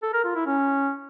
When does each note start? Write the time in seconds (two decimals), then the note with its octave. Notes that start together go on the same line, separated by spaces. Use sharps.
0.02 A4
0.13 A#4
0.24 F4
0.35 E4
0.46 C#4